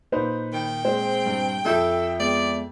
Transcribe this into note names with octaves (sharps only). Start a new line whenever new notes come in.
A#2 A#3 D#4 B4 C5
D#3 G5
G#3 C4 C5
G2
F2 A4 E5 G6
G#3 B3 D5